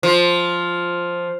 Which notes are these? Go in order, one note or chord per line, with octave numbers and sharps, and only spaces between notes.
F3